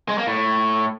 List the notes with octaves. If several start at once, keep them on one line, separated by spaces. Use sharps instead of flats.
G#3
A#3
A2